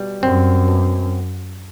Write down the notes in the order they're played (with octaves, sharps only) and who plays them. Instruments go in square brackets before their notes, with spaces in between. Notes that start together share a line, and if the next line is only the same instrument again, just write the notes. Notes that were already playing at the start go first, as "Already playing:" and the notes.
Already playing: [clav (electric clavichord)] B2 G3
[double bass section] F#2 [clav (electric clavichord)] C4
[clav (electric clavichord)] B2